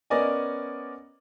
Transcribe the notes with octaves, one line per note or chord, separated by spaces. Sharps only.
B3 C#4 A#4 D5 D#5 G#5